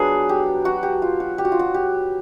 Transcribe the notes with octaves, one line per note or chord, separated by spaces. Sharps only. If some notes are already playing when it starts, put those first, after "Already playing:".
Already playing: F#3 B3 D4 G#4
G4
F#4
G4
F4
F#4
G4
F#4
F4
F#4
G4